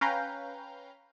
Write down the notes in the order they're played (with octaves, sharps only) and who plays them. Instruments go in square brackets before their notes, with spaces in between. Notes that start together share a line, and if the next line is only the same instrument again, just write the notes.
[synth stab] C#4 B4 F5 G5 A#5 G6